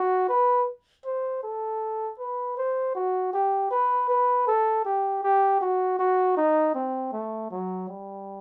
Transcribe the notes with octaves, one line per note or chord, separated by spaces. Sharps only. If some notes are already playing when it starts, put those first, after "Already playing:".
Already playing: F#4
B4
C5
A4
B4
C5
F#4
G4
B4
B4
A4
G4
G4
F#4
F#4
D#4
C4
A3
F#3
G3